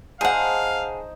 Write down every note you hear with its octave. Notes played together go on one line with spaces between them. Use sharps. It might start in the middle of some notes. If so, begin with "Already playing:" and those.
D#4 G#4 C5 F5 F#5 A5